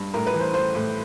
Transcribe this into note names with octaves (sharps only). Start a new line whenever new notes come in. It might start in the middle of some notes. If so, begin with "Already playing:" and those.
Already playing: G2
A2 A#4
B4
E3
C5
A3 C5
A2